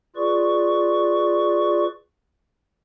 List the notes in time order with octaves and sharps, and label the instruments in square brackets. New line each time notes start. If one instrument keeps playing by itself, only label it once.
[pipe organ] F4 G#4 B4 D5 C#6